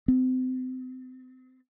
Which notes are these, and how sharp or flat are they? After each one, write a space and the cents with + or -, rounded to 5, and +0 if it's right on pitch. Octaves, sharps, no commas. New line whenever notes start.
C4 -35